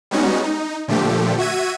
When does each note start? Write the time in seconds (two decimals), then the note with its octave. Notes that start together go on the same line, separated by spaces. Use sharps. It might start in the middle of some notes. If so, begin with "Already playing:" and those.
0.11 G3 G#3 B3 C#4 D#4 F#4
0.44 D#4
0.88 A#2 D3 F3 A3 G4
1.38 F#4 E5 G#6 D#7